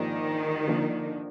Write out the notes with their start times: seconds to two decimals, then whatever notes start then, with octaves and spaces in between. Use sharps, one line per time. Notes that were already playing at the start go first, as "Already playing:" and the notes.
Already playing: G#2 D#3 F3 A#3 D4 G4
0.68 D3 F3 A#3 D4